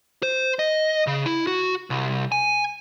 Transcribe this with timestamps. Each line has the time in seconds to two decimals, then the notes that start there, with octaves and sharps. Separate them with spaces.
0.23 C5
0.59 D#5
1.07 C#3
1.26 E4
1.47 F#4
1.90 C2
2.32 G#5